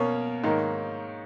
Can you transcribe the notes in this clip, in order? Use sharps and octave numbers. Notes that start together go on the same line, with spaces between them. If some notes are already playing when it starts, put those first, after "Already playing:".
Already playing: B2 A#3 C#4 A#4 C#5
G#2 D#3 A#3